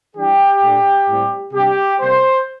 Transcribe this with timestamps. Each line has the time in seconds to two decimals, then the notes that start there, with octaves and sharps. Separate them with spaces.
0.16 E3 G3 D4 G4
0.63 A#2 A3 D4
1.08 A2 G3 C4
1.53 C3 G3 D4 G4
2.00 C3 G3 A#3 C5